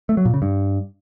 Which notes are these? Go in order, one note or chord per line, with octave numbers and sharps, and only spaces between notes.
A3
F#3
A#2
C#3
G2